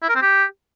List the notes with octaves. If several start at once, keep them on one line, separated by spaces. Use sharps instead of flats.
E4
A#4
C4
G4